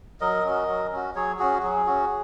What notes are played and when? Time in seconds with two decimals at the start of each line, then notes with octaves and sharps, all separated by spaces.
0.21 F#3 A#4 D#5
0.45 C#4 F#4
0.68 F#3
0.92 C#4 F#4
1.15 F#3 G#4 C#5
1.39 C#4 F#4 G#4
1.63 F#3 G#4
1.86 C#4 F#4